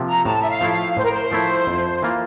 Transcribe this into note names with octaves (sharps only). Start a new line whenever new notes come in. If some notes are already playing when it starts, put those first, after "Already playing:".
Already playing: C3 F3 A#3
A#5
A2 A5
E5
F5
F3 A3 E4
F5
A2 C5
A#4
C5
F3 A3 E4
F2
E3 A#3 F4